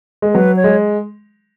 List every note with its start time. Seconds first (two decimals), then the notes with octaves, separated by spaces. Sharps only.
0.22 G#3
0.34 F#3 B4
0.56 C#5
0.64 G#3